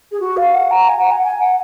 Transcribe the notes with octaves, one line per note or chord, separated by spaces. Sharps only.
G#4
F#4
F5
F#5
A#5
G#5
F#5
G#5
G#5
F#5